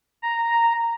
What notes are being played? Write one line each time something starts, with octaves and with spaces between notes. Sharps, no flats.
A#5